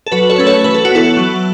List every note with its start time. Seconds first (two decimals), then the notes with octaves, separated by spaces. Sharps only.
0.07 A4
0.12 F#3 F#4 B4
0.30 A4 C#5
0.38 A3 C#4 B4
0.47 A4 C#5
0.64 E3 B4
0.74 A4
0.85 F#4
0.91 B3 E4 A4
1.17 F#3